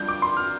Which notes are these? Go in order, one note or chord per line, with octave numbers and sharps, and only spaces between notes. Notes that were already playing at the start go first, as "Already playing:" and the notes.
Already playing: G2 F3 D4 G6
D6
C6
F6